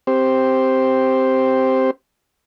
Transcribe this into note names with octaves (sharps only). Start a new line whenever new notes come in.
C4 G4 C5